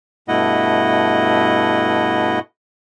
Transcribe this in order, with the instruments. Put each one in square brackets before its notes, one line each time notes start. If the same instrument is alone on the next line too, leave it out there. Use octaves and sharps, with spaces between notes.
[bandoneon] G2 B2 A3 E4 D#5 F#5